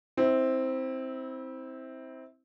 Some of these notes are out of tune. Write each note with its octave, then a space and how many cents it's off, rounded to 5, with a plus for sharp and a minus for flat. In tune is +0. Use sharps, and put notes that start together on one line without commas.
C4 +0 E4 -30